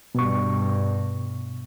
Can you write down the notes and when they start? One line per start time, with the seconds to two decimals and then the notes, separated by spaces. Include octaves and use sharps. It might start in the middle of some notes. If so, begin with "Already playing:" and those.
0.15 G2 B2 C#6